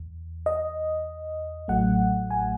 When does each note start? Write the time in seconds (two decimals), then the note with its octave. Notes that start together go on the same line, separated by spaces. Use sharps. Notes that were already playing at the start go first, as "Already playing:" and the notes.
Already playing: E2
0.46 D#5
1.68 A1 A2 F#3 A3 F#5
2.31 G#5